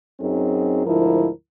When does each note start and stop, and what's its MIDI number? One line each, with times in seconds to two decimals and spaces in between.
0.20 0.86 42
0.20 0.86 54
0.20 0.86 60
0.20 0.86 63
0.20 0.86 68
0.86 1.28 38
0.86 1.28 44
0.86 1.28 53
0.86 1.28 64
0.86 1.28 70